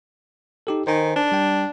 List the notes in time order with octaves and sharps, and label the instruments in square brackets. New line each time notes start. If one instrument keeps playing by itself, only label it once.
[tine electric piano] D#4 G4 A4
[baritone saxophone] D#3 [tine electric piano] C5 G#5
[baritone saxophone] D4
[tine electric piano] G3 G5